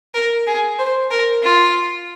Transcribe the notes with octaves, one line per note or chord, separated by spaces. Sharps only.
A#4
G#4
C5
A#4
F4